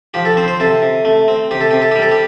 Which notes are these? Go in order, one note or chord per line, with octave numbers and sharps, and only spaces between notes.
F3 G4
A4
C4 C5
C5
C3 A4
C3
A3
C4
C3 G4
A4
C3 G4
A4
G3 G4
A4
G4